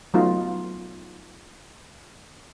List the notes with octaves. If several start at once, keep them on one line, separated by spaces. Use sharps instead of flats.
F#3 A3 B3 D#4 F4